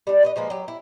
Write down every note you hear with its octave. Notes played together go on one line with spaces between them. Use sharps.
G3 D4
B4 C5 D#5
F3 G#3 A#3 B4
F#3 G4
E4